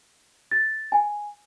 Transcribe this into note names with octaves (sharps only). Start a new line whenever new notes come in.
A6
G#5